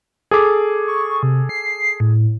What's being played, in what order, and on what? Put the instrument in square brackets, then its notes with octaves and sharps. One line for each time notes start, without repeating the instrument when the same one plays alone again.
[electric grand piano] G#4 A4 D6
[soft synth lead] C#6
C3
C7
A2